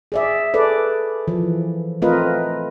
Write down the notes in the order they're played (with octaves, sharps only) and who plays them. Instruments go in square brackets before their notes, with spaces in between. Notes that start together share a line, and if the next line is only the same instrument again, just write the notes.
[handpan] G#4 D5 E5
G#4 A4 B4 D5
E3 F3
A3 C4 F4 A#4 B4 D#5